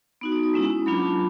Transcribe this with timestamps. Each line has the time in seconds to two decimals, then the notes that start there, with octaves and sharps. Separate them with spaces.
0.21 B3 D#4 F#4
0.32 D#6
0.43 D#6
0.54 G#3 C#4 E4
0.86 F#3 A#3 D4 F4 B5
1.03 A5